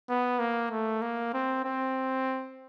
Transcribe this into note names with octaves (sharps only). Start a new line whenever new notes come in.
B3
A#3
A3
A#3
C4
C4